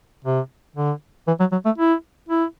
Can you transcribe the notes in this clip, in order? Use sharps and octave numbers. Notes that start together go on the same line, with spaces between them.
C3
D3
E3
F#3
F#3
A3
E4
E4